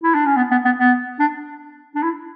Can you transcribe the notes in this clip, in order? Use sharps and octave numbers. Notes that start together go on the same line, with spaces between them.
E4
D4
C#4
B3
B3
B3
B3
D4
D4
E4